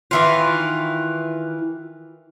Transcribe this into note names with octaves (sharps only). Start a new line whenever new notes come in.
D#3 E3 F4